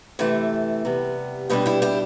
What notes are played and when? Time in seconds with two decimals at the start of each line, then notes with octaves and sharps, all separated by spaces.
0.19 C3 E3 A3
0.85 C3 G3 B3
1.50 B2 G3 D4 G4 B4
1.66 E4 G4
1.82 E4 G4